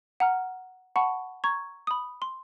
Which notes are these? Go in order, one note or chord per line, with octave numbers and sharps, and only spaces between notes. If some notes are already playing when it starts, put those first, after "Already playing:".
F#5 A#5 F6
F#5 A5 B5 C#6
A#5 C#6 G#6
B5 D#6
C6